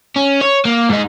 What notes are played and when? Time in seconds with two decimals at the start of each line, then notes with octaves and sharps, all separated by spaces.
0.16 C#4
0.41 C#5
0.65 A#3
0.90 G#2 D#4